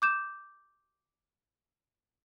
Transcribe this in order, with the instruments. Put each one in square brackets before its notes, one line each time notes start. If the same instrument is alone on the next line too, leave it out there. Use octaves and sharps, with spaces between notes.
[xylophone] D6 G6 E7